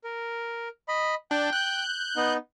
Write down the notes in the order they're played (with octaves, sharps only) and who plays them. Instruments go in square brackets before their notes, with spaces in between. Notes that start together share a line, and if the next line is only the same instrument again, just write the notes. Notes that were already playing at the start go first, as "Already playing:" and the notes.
[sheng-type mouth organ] A#4
D#5 B5
[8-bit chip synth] D4 [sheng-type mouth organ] G5
[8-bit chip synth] F#6 G6
[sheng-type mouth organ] B3 D#4